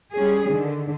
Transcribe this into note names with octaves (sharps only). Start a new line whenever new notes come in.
G3 C#4 G#4
D3 D#3